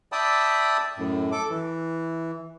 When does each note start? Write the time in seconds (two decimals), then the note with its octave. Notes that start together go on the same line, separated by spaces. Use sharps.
0.12 D5 E5 G5 A5 B5 D#6
0.98 F#2 A2
1.32 A4 D6
1.50 E3